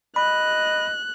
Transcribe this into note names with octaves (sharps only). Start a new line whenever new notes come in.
D#5 B5 F#6